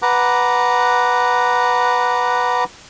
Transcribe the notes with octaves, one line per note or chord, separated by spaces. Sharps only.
B4 F#5 A#5 D6